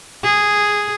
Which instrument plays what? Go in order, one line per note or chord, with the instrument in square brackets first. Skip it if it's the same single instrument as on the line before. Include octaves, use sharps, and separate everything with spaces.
[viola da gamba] G#4